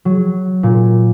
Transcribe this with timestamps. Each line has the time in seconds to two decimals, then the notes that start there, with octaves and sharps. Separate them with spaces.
0.05 F#3
0.63 A#2